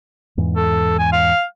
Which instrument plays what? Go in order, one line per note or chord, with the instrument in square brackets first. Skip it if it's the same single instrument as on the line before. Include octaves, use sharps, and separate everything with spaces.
[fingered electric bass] E2 G#2 E3
[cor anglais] A4
G#5
F5